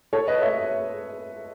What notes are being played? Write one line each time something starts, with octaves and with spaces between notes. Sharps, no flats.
A4 C#5
B4 D#5
C#5 E5